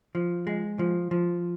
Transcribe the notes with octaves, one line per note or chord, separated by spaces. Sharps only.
F3
G#3
F3
F3